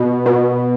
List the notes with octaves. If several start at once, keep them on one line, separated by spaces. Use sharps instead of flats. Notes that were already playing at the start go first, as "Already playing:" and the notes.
Already playing: B2
B2